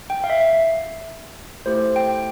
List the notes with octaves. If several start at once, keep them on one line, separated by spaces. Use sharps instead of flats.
G5
F5
E5
A3 E4 G4 C5
G5